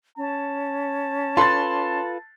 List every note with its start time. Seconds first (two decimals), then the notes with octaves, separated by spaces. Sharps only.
0.17 C#4 A5
1.37 F4 A4 B4 C6 A6